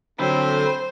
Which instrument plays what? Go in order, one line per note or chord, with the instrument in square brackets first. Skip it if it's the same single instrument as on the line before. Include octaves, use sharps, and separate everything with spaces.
[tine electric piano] D3 F#3 [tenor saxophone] C4 [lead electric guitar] A4 B5 [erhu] C5